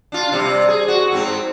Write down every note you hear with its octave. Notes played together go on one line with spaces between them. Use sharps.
D4 F4
C3 G3
G#4
F#4
G#2 C4